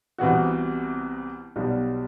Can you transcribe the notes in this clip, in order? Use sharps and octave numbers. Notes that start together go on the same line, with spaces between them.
C2 C3 E3 B3 F#4
B1 B2 G3